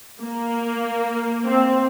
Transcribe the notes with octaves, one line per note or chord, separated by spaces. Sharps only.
A#3
C4